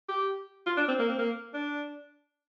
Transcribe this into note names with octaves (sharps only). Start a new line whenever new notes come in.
G4
F4
D4
C4
A#3
C4
A#3
D4